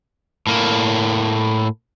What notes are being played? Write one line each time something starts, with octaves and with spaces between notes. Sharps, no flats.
A2 A#3